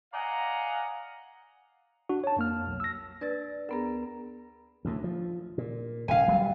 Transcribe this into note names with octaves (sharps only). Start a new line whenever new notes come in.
D5 D#5 F5 F#5 G#5 A#5
D4 F#4
C#5 A5
F2 A#3 F6
B1
E6 A#6
D4 B4 D5 A6
D2 B3 G#4 A#4 A#5
D2 A2
F3
A#2
D#1 C#3 F5 G#5
D1 F#3 G3